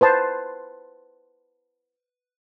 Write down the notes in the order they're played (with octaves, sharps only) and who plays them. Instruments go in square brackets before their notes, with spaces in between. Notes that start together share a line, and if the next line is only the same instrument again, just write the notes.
[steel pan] B4 C5 A5 C6